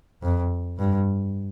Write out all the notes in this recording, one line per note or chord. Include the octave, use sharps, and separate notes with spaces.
F2
G2